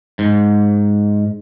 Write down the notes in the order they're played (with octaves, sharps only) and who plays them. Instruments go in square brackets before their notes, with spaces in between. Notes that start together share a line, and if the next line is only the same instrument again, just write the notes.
[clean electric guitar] G#2